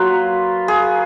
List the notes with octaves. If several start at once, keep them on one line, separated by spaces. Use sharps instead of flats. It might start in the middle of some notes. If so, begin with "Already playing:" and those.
Already playing: F#3 A#3 F4 B4
G#4